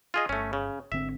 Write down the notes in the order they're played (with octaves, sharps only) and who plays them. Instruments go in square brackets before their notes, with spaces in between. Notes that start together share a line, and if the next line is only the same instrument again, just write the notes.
[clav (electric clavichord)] F4 G#4 D#5
[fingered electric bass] G1 [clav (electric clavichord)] A3 C#4
[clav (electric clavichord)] C#3
[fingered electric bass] G#1 D3 C4 [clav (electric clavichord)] E5